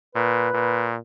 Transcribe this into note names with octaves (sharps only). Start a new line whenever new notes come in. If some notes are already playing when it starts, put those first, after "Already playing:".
A#2 B4
A#2